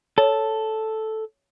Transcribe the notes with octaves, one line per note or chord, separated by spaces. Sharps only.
A4 C#5